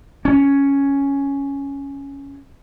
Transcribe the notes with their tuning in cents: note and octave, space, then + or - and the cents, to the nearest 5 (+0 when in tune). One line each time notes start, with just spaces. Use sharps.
C#4 +5